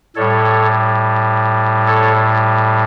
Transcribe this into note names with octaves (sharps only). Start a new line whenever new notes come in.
A2 G3 A4 C#5
A4 C#5